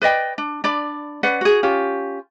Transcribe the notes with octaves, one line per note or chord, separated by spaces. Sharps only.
B4 D5 D#5 G5
D4
D4 D5 B5
C#4 B4 D5 F#5
F#4 G#4
C#4 F4 G4